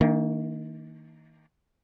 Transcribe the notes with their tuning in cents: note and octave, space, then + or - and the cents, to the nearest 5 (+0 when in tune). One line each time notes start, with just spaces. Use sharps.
D#3 +30 A#3 -20 D4 +0